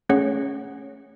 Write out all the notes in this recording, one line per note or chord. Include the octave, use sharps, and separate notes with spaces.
A3 C#4 G#4 C#5 F#5